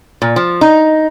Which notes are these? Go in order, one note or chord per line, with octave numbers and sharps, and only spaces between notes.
A#2
F3
D#4